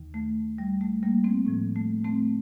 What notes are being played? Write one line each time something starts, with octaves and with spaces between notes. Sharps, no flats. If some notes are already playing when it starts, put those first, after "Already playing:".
Already playing: D#2 D#3
A3
G3
A3
G3 A#3
A3 C4
A2 F3
A3
A3 C4